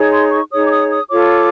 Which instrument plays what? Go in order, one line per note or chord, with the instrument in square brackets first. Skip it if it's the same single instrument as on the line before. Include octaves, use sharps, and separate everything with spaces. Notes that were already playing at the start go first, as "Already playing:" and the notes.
Already playing: [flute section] D#4 G#4 C#5
C6
C#6
D#4 G#4 C#5 D#6
D6
D#6
D#6
F4 A4 C#5 D6